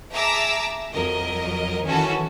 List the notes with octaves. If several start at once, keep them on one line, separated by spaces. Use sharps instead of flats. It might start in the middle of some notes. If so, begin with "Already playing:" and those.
G#4 E5 A5 A#5 D6 E6
F2 F#3 A#4 D#5
D#3 E3 C#4 F#4 A4